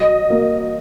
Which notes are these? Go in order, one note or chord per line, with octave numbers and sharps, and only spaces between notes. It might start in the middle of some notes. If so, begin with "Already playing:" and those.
Already playing: F#3 D#5
A#3